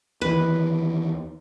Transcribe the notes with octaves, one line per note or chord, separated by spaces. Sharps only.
D#2 E3 B4